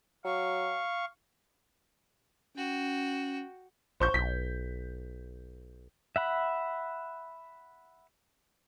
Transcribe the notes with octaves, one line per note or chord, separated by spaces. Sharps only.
F#3 F5 C#6
C#4 F#4 G5
A#1 C5 C#6 G6
B1 B6
E5 F#5 B5